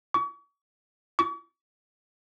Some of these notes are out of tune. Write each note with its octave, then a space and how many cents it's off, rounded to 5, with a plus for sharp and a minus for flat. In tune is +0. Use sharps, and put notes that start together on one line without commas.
C#6 +40
C#6 +45